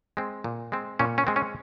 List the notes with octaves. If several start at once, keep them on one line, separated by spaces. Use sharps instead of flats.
G#3 C4
A#2
G#3 C4
A#2 C#4
C#4
G#3 C4
C#4